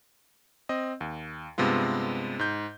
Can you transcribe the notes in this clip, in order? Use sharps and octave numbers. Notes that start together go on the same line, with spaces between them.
C4 D#5
D#2
G2 C3 G#3 B3 F4
G#2 G6